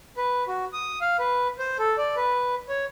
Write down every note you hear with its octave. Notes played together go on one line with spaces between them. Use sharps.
B4
F#4
D#6
F5
B4
C5
A4
D5
B4
C#5